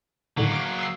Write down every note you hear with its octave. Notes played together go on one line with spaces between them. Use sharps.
A2 D3 D#3 F#3 A#3
D6 F6 D7
D#6 E6 C7